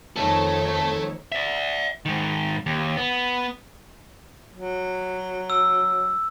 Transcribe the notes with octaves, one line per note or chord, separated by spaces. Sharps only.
F2 D#3 A3 A4 C#5
D5 E5
G#2 D#3
D#2
B3
F#3
E6